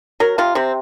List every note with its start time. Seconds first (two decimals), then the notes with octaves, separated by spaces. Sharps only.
0.20 F#3 A#4
0.38 C3 F4
0.55 C3 C4